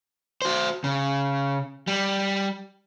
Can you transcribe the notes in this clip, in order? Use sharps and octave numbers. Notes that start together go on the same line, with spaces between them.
F#4 C5
C#3
G3